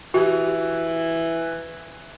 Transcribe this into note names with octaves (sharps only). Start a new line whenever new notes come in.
E3 F#4 G4